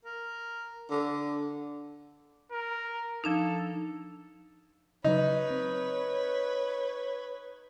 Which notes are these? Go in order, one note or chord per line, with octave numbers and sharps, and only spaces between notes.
A#4
D3
A#4
F3 D4 D#4 A4
C#3 F#3 D#4 B4 C#5
C4